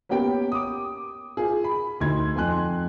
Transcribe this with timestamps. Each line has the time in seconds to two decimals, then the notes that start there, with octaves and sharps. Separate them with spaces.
0.09 A#3 B3 C#4 G4 G5
0.52 D6 D#6
1.37 F4 G#4
1.64 B5
2.00 D2 D#4 C6 G#6
2.36 F2 G#5 C6 F#6